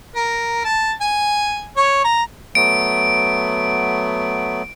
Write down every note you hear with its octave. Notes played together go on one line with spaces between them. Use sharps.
A#4
A5
G#5
C#5
A#5
F#3 A3 B3 D7